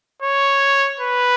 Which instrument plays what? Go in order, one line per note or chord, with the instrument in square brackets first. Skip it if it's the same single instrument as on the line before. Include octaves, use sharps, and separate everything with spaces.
[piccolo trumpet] C#5
B4